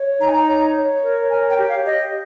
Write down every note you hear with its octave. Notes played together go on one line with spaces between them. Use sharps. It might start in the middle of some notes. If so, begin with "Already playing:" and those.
Already playing: C#5
D#4 A#5
G#5
A#5
C#5
C#5
A#4
C#5 G#5
G5
G4
F5
G4 D#5